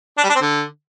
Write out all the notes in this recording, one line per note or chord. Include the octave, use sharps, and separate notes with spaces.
D4
G3
D4
C4
D3